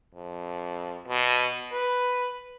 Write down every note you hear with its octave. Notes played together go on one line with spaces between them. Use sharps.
F2
B2
B4